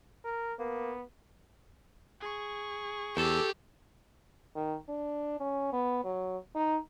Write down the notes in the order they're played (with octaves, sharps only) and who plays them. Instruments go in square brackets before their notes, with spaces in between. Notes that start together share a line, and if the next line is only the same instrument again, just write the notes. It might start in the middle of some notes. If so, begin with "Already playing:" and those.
[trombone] A#4
[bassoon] A#3 [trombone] B3
[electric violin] G#4 C#6
[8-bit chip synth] E2 [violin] G4 [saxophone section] A4
[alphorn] D#3
D4
C#4
B3
F#3
D#4